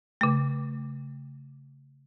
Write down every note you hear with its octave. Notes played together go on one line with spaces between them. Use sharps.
C#3 A3